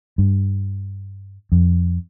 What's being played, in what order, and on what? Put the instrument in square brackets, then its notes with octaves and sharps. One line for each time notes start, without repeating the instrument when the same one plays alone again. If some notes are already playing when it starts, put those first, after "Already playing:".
[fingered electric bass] G2
F2